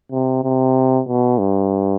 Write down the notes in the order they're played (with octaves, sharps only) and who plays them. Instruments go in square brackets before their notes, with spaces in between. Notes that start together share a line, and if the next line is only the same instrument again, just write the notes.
[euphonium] C3
C3
B2
G2